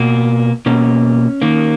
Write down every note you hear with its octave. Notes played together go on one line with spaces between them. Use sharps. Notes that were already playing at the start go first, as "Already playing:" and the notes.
Already playing: B2 A#3
B2 A#3 C#4
D#3 A#3